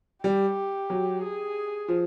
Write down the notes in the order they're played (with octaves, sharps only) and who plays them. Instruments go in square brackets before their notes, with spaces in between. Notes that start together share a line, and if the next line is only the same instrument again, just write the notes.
[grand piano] G3 [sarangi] G4
[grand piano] F#3
[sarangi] G#4
[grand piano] F3